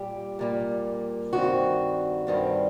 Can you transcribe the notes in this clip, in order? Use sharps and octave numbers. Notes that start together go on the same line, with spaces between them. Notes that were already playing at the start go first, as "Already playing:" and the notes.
Already playing: A#2 G3 G4
A#2 G3 A#3
G2 D#3 G3 C4 F#4
G2 D#3 G3 C4